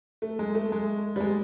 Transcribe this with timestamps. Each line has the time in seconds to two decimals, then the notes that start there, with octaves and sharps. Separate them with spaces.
0.22 A3
0.39 G#3
0.55 A3
0.72 G#3
1.16 G3
1.20 G#3